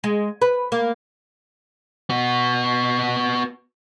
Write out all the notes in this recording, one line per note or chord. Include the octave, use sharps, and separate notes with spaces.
G#3
B4
A#3
B3 F#4